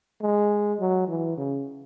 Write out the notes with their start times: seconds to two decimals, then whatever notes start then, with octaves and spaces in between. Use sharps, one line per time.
0.22 G#3
0.80 F#3
1.08 E3
1.37 C#3